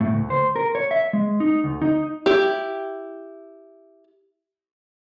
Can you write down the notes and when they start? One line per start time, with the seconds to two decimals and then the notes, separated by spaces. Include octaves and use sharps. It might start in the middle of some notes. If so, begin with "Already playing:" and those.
0.01 A2
0.13 D2
0.30 C5
0.56 A#4
0.75 C#5
0.91 E5
1.13 G#3
1.40 D#4
1.64 D2
1.82 D#4
2.26 E4 G4